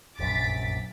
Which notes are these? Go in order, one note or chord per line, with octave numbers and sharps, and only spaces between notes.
F1 A#1 F#2 D6 A6 B6